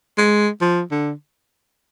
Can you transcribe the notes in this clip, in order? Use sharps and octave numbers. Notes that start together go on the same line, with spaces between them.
G#3
F3
D3